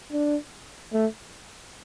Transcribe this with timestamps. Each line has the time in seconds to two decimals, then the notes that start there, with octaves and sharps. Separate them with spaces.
0.11 D4
0.93 A3